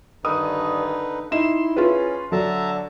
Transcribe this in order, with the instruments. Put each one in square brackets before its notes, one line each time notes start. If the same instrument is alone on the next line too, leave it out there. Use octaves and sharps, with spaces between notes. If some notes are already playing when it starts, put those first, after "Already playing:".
[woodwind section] G2 D#3 [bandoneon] D3 D#4 B4 [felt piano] D#6
[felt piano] D#4 E7 [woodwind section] E4 [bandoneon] C6
[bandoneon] C#4 [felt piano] F4 G#4 B4
[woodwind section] D3 [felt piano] F#3 [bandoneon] E5 A5 A#5